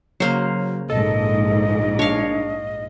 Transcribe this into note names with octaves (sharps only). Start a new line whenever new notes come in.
C#3 F#3 A#3 C5
A#1 G#2 A4 D#5
D4 C#5 F5